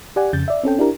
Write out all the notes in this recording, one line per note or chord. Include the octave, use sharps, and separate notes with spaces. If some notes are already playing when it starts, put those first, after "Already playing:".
G4 D5 F#5 G#5
F2 C#3 G6 A6
D5 E5
C4 C#4 A4 G5
D4 E4 G4 A#4